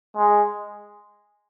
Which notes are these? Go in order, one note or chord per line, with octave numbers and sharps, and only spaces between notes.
G#3